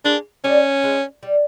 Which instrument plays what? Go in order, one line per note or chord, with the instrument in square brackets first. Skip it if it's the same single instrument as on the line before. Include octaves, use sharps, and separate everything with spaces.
[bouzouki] G#3 A#3 [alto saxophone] D4
[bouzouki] G3 A3 [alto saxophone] C#4
[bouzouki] G#3
G3